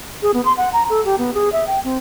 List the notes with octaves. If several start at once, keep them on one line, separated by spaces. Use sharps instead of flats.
G#4
B3
C6
F#5
A#5
A4
G4
B3
G#4
E5
G5
C4